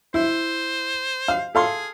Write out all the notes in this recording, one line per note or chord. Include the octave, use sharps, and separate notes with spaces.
E4 C5
F5
G#4 A4 F5 C6